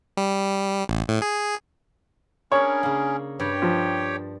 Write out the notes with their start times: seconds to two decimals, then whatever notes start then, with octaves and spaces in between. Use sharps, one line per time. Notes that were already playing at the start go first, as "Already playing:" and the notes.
0.17 G3
0.89 A1
1.08 A2
1.22 G#4
2.52 C#4 D4 G#4 A#4 C#5 B5
2.83 C#3 A#3
3.39 G2 G3 G4 C#5 G5
3.62 F3